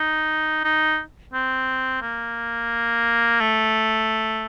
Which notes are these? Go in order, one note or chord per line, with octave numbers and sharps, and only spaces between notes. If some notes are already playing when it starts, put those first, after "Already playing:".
Already playing: D#4
D#4
C4
A#3
A3